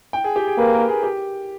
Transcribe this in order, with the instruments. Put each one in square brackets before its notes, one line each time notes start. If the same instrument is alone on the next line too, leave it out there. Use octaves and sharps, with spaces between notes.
[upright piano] G5
G#4
G4
G#4
[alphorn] A#3 [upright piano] B4
[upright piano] A#4
G#4
G4